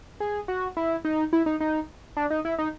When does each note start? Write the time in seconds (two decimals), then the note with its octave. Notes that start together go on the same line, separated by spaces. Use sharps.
0.20 G#4
0.48 F#4
0.77 E4
1.05 D#4
1.33 E4
1.46 D#4
1.60 D#4
2.17 D4
2.30 D#4
2.45 E4
2.58 D#4